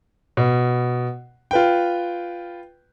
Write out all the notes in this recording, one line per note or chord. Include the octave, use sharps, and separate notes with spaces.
B2
F4 B4 G5